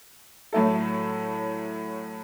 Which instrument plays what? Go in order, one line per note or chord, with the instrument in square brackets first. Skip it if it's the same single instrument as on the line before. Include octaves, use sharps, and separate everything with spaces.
[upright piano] A2 F#3 A3 E4 A4